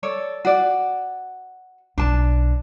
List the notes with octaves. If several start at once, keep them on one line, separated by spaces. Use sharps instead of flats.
A4 C#5 D5
F#4 D5
B1 D4 A5